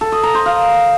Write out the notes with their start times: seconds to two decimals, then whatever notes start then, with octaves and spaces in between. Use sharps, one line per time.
0.01 A4
0.12 D#5
0.23 A#5
0.34 C5
0.46 F5